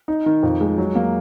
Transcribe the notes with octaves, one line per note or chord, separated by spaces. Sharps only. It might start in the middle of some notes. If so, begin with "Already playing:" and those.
D#4
D#3
F2
G#3
F#3
A#3